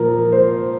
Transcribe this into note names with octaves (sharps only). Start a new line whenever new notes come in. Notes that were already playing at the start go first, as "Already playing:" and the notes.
Already playing: A#2 F3 A#4
C5